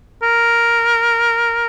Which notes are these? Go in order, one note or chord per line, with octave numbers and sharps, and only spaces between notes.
A#4